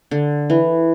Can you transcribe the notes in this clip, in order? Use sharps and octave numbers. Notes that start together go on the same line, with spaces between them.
D3
E3